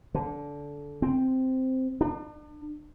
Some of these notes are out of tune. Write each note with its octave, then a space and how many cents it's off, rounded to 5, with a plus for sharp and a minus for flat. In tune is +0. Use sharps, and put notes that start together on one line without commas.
D3 -20
C4 -5
D4 +40